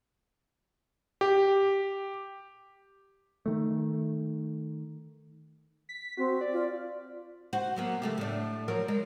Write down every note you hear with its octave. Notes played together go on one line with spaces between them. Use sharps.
G4
D#3 A3
B6
C4 F#4
D5
F4
F#4 C5
F#3 A#3 B3
C#3 A3 G4
A2 D4
F3 F#3 A#4
G#3